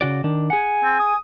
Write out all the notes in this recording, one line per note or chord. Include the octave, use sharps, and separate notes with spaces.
C#3 F#4 D5
D#3 D4
G#4 F#5 G#5
C4
D#6